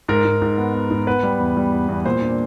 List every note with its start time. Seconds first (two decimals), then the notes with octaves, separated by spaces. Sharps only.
0.08 G#2 A#4
0.25 G#2
0.42 G#2
0.58 B3
0.74 B3
0.91 G#2
1.07 B3 B4
1.23 G3
1.39 E2
1.57 G3
1.72 E2
1.89 E2
2.05 A#2 C5
2.23 D4